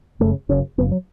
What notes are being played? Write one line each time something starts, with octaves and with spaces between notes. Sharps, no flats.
F#1 F#2 C#3 A3
F#1 F#2 C#3 C#4
F#1 F#2 C#3 B3
F#3